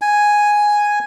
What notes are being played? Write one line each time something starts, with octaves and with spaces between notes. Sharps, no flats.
G#5